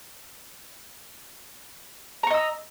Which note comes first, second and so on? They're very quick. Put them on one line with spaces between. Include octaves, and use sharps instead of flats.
A#5 C#6 D#5 E6